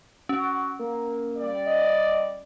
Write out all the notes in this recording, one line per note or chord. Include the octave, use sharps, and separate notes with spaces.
C#4 F#4
A#3
G3 D5
D#5